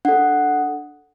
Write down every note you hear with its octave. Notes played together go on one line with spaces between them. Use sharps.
D4 A4 F#5